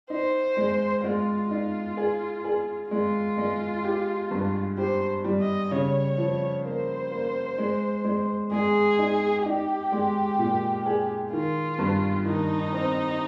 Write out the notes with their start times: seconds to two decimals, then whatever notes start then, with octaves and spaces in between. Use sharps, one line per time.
0.10 D#4 C5
0.57 G#3
1.04 G#3 F4
1.50 D#4 F4
1.97 G#4
2.44 G#4
2.91 G#3 F4
3.38 G#3
3.84 G4
4.31 G2
4.77 G4 C5
5.24 G3
5.40 D#5
5.71 C#3 C#5
6.18 F3
6.64 A#3 C5
7.12 A#3
7.58 G#3
8.04 G#3
8.52 G#3 G#4
8.99 D#4
9.45 D#4 G4
9.92 G#3
10.39 A#2
10.86 G#4
11.32 D#3 F4
11.79 G2
12.25 D#3 D#4
12.72 C4